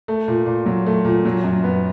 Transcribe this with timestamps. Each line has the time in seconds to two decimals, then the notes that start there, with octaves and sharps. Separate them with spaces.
0.08 A3
0.28 A#2
0.46 A#2
0.66 F#3
0.86 A3
1.05 A#2
1.25 F#3
1.44 F#2
1.64 B3